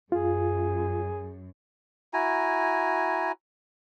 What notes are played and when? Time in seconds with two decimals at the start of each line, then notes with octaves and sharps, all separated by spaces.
0.12 F#2 F4 G#4
2.13 E4 F#4 G#5 A#5